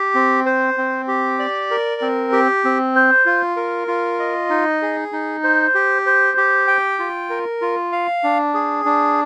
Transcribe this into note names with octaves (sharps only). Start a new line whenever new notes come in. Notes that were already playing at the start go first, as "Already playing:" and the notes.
Already playing: G4
C4
C5
C4
G4
D5
A#4
C4
G4
C4
C5
F4
A#4
F4
D#5
D#4
G#4
D#4
C5
G4
C5
G4
G5
F4
A#4
F4
F5
D4
G#4
D4